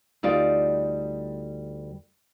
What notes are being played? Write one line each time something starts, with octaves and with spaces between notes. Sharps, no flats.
D2 G3 D#4 F4 D5